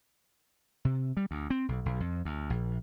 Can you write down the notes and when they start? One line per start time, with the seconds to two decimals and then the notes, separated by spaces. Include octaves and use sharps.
0.85 C3
1.17 G3
1.31 D2
1.50 C4
1.68 B1
1.86 B1
2.00 F2
2.25 D2
2.50 A#1